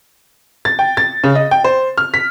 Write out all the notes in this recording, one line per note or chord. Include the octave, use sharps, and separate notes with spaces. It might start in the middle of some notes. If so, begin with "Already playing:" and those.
A6
G5
A6
C#3
D#5
G5
C5
F6
B6